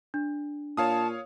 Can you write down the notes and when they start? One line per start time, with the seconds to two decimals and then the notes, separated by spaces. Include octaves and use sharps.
0.14 D4
0.77 A#2 C#5 F5 A5 D#6